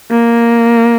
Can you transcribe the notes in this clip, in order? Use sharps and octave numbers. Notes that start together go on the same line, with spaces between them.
A#3